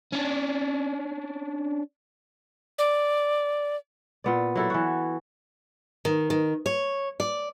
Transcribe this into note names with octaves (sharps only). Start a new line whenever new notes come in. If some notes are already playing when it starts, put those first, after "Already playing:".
C#4 D4
D5
A#2 B3 D5
F#3 E4 A4
E3 F#4
D#3
D#3
C#5
D5